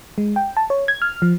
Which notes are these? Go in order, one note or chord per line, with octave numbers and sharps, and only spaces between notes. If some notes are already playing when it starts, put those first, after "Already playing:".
G#3
G5
A5
C#5
G#6
F6
F3